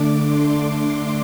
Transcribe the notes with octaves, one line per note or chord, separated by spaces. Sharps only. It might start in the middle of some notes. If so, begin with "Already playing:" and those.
Already playing: D3 A3 D4 D6
C6
C6